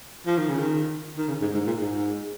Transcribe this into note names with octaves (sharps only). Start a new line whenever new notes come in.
F3
D#3
C#3
D#3
D#3
C#3
G#2
G#2
A#2
G#2